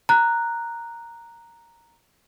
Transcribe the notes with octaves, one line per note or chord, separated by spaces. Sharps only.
A#5 F#6